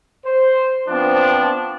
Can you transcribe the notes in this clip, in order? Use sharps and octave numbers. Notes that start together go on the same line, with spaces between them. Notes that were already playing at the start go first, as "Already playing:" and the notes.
C5
F3 B3 C4 D4